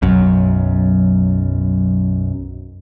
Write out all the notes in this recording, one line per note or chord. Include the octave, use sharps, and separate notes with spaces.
B1 F#2